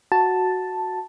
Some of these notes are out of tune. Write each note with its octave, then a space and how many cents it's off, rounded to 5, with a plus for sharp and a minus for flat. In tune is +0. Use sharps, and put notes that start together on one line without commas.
F#4 +0 A5 +0